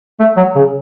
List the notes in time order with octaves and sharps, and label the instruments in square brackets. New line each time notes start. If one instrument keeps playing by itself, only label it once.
[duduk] A3
F#3
C#3